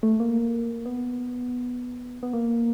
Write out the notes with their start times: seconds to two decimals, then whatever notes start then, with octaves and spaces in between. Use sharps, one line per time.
0.03 A3
0.20 A#3
0.86 B3
2.23 B3
2.33 A#3